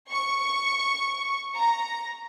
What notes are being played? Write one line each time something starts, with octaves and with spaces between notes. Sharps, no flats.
C#6
A#5